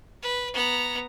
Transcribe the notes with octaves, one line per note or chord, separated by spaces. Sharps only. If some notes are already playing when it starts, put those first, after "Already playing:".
B4
B3 A#5